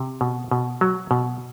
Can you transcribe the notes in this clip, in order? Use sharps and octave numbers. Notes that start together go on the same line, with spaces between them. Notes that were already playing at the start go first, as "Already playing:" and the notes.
Already playing: C3
B2
B2
F#3
B2